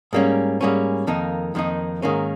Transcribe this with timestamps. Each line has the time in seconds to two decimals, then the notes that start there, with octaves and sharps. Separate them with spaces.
0.13 G#2 G3 A#3 C#4
0.61 G#2 G3 A#3 C#4
1.07 F2 D#3 A#3 D#4
1.55 F2 D#3 A#3 D#4
2.02 G#2 D#3 A#3 C#4